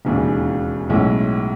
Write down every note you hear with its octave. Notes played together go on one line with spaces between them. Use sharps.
E1 D#2 C#3 E3
B1 A2 G#3 C#4 E4